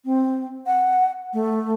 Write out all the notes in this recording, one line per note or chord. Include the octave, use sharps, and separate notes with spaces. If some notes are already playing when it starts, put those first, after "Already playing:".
C4
F#5
A3